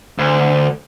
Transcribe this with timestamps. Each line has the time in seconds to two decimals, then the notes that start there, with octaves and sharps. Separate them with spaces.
0.18 D2